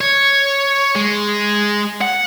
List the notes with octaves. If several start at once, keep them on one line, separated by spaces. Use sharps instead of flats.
C#5
G#3
F#5